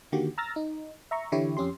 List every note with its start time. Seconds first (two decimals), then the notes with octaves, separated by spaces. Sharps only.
0.12 D3 D#3 A#3 F#4 G4
0.38 A#5 E6 F6 A6 A#6
0.56 D#4
1.11 E5 A#5 C#6
1.32 D3 E3 E4 G4 C#5
1.57 F2 C#4 G4 C6